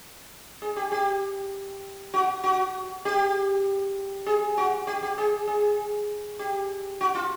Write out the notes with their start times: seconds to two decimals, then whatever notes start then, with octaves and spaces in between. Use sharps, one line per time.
0.62 G#4
0.76 G4
0.92 G4
2.14 F#4
2.44 F#4
3.05 G4
4.26 G#4
4.57 F#4
4.87 G4
5.03 G4
5.18 G#4
5.47 G#4
6.39 G4
7.01 F#4
7.15 F4